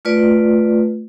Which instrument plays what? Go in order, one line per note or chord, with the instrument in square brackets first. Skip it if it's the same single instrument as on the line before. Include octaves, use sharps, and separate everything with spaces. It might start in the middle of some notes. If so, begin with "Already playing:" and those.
[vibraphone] A3 F4 B4 D5